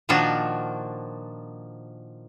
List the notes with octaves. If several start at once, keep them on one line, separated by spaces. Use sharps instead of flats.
A#2 D#3 F3 D4 F#4